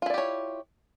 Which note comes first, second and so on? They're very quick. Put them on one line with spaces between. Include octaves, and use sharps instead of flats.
F4 E4 D5 G4 C#5